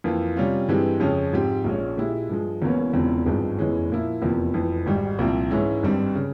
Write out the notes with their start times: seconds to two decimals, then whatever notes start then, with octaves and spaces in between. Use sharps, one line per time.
0.04 F2 E3 A#3 F4
0.36 C3 G3 C#4 F4
0.68 G2 E3 G#3 C4 G4
1.00 F2 C#3 F3 G#3 C#4
1.33 G#2 F3 C4 G4
1.64 A#1 A#2 G#3 C#4
1.97 A#2 G#3 E4 G4
2.29 G2 F3 G#3
2.62 E1 E2 E3 A#3 C#4
2.93 E1 E2 C#3 F3 C4
3.26 G#1 G2 F3 G#3 C4
3.57 F1 E2 E3 G#3 C#4
3.90 A#2 F3 A#3 E4
4.22 F1 E2 C3 F3 A#3
4.54 F1 F2 E3
4.86 G#1 G#2 G3
5.19 C2 A#2 F3 C4
5.51 G#2 E3 G#3 C#4 E4
5.83 G#1 G2 G3 C4
6.15 C#3